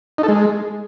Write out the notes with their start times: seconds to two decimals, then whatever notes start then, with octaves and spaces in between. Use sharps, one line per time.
0.18 D#4
0.23 A4
0.28 G#3